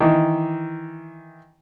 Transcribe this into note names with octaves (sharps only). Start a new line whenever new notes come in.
D#3 E3